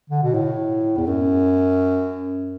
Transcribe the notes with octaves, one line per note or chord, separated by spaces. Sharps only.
D3
B2
A2
E2
F#2